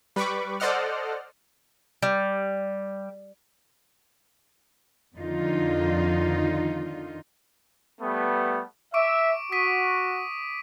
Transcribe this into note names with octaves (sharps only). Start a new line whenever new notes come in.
G3 B4 B5 C#6 D6
A4 C5 D5 D#5 F#5 F6
G3
F2 D3 D#3 D#4 F4
G3 A3 B3
E5 C#6 D6 D7
F#4 D#6 B6 D#7